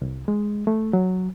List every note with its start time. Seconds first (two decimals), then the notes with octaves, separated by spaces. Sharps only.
0.02 C2
0.28 G#3
0.67 A3
0.93 F#3